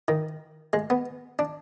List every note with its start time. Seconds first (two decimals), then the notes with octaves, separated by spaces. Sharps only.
0.08 D#3
0.73 G#3
0.90 B3
1.39 D4